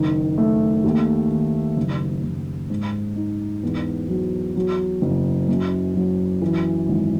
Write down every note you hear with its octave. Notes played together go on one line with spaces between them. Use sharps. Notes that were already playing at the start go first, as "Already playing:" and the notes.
Already playing: F#1 D#3
A3
D#2
D#3
F#1
F#1
G#2
D#4
E2
F#3
F#3
F#1
F#2
F#3
E3
G#1